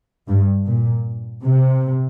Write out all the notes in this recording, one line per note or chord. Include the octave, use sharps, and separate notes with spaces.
G2
A#2
C3